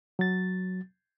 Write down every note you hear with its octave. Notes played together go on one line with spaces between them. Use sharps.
F#3 A6